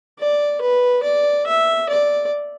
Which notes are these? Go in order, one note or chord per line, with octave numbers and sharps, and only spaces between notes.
D5
B4
D5
E5
D5